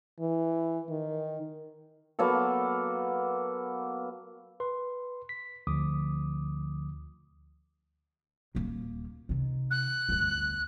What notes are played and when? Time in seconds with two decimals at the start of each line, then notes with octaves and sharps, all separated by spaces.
0.20 E3
0.89 D#3
2.19 F#3 A#3 B3 A4
4.60 B4 C6
5.29 B6
5.67 D2 D3 F3 D6 D#6
8.55 D#1 A#3
9.29 C3 D#3
9.71 F#6
10.09 G1 D2